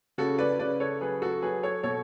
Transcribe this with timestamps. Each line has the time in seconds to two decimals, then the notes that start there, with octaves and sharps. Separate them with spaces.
0.18 C#3 F#4 A4
0.39 B4 D5
0.59 C#3 B4 D5
0.80 A4 C#5
1.01 F#3 G#4 B4
1.22 F#4 A4
1.42 F#3 G#4 B4
1.63 A4 C#5
1.83 B2 A4 C#5